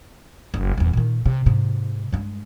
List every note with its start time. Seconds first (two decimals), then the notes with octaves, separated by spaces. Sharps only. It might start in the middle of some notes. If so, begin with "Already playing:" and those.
0.54 F#1
0.77 D#1 E2
0.93 A#2 D#3
1.26 C3
1.46 G#2 C3
2.13 G2 G#3